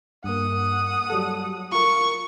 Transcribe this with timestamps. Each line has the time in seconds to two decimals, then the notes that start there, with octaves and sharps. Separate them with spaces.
0.24 G2 A#3 F#5 D#6
1.10 F#3 G3 A4
1.72 F4 A#4 C#6